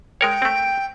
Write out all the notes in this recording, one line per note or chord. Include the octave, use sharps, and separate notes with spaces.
G#3 A#4 C#5 G5
A3 C4